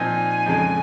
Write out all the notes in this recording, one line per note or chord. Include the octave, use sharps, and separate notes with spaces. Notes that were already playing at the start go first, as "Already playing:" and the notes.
Already playing: A#2 F3 C4 D#4 G#5
F2 C#3 G#3